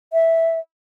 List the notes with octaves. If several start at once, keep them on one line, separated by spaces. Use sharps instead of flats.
E5